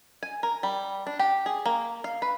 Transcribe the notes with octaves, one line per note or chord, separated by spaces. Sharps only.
G#5
A#4
G3
D4
G4
G#4
A#3
F5
B4